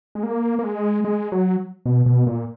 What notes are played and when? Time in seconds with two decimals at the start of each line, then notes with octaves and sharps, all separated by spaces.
0.15 G#3
0.23 A#3
0.59 A#3
0.64 G#3
1.04 G#3
1.32 F#3
1.85 B2
2.06 B2
2.27 A#2